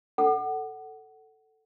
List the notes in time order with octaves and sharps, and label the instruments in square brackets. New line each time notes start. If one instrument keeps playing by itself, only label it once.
[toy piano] A4 F#5